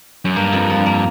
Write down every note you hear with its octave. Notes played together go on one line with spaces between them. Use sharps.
F#2
G2 A#3
F2
F3
A#3